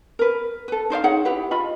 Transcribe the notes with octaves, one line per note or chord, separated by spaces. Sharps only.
A#4 B4
A4 B4
D#4 C5 D5 F5
D#4 G#4 C#5 F#5
E4 G4 B4
F4 D#5 B5